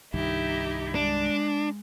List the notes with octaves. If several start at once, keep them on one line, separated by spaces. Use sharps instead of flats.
C2 G2 D#3 D#4 E4 G4
G#3 D4